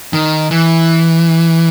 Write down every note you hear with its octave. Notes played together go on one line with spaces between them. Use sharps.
D#3
E3